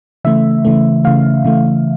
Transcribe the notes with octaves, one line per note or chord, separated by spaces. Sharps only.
C#3 E3 A3 E5
C#3 E3 A3
C#3 E3 A3 F5
C#3 E3 A3